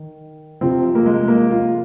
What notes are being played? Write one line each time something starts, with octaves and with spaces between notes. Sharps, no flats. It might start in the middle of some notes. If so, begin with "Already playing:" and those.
Already playing: D#3
F2 C3 F3 C4
A#3
G#3
A#3
F4